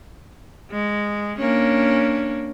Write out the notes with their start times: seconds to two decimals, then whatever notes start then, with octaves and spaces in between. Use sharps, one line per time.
0.71 G#3
1.37 A#3 C#4 D4